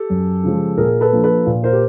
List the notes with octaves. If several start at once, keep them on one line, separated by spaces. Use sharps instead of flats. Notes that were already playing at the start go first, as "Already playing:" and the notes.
Already playing: G4 A4
F#2
C#3 F3 G#3
A#2 G#4 A#4
A4 B4
F3 A#3 D4
A4 B4
A#2
A#4 C5
G4